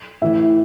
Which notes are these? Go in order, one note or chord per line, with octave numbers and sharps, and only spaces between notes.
A2 E3 E5